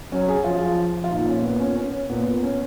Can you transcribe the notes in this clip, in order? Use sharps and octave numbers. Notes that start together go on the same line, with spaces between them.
F#3 C#4
G#4
F3 F4
F4
A#2 D#4
C#4
B3
C#4
C#4
A#2 B3
C#4